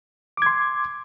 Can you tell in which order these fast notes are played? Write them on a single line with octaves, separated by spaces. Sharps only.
D6 G#6 C6